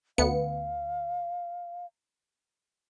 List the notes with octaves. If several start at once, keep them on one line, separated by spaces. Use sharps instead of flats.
D2 B3 F5 C#7